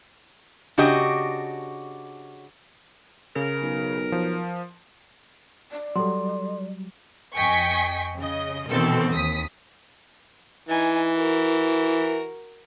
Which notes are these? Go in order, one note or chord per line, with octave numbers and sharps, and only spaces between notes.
C#3 D4 F#4 G4 D#5
C#3 A#4
B1
F3
D5
F#3 G3 A4 C6
F2 D#5 G5 G#5 C#6 B6
C#3 D#5
B2 D#3 E3 C4 A4
D#2 D#6 B6
E3 D#4 G#5
F#4 A#4